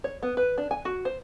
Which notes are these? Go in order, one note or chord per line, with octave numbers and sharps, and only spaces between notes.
C#5
B3
B4
D4
G#5
F#4
C5